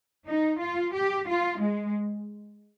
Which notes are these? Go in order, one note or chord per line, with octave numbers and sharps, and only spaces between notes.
D#4
F4
G4
F4
G#3